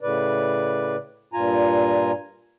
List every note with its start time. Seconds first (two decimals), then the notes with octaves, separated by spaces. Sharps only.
0.01 A2 C#3 B4 D5
1.33 G2 A#2 F4 G#5 A#5